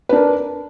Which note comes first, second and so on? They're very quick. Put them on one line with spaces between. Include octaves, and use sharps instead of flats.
B4 D4 A#4